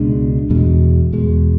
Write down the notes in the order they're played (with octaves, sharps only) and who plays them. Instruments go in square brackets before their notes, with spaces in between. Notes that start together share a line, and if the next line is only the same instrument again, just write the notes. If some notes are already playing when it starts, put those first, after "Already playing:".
Already playing: [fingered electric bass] C#2 B2 G#3 D4
E2 B2 G#3
E2 B2 G#3